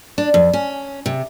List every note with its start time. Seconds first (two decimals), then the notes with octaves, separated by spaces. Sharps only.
0.18 D4
0.34 F2
0.53 C#4
1.06 C3